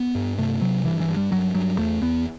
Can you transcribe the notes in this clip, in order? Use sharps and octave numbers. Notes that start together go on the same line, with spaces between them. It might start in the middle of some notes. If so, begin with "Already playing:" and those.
Already playing: B3
G2
C3 A3
C3 F#3
G2 E3
E3
G2
G3
G2 F#3
G2 F#3
E2 A3
E2 B3